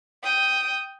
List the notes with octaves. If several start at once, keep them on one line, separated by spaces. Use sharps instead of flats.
G5 D#6